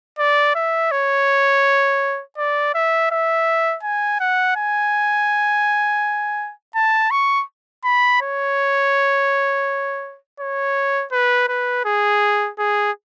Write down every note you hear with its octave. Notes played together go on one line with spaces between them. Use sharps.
D5
E5
C#5
D5
E5
E5
G#5
F#5
G#5
A5
C#6
B5
C#5
C#5
B4
B4
G#4
G#4